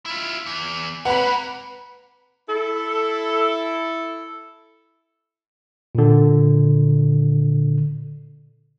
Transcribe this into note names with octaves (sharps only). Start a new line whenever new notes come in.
E4 F4
E2
C3 A#3 B4 F#5 B5
E4 A4
A#2 D3